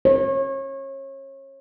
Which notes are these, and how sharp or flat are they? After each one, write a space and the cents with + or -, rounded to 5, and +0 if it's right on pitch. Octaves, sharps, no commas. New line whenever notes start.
C#5 -30